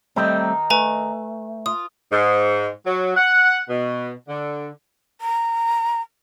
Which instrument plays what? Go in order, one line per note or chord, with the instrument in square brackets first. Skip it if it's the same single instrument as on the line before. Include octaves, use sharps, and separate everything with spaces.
[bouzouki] D#3 D#4 [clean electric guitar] G3 A3 C4
[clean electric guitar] A3 [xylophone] B4 G#5 A#5
[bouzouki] F4 [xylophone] D#6
[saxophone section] G#2
F#3
F#5
B2
D3
[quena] A#5